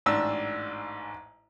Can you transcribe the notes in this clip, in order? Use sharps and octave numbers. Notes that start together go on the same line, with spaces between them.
A1 G#2 D4 E6